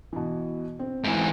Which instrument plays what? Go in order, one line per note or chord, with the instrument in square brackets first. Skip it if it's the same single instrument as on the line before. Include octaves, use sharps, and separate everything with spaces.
[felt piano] B2 E3
C4
[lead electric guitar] G#2 E3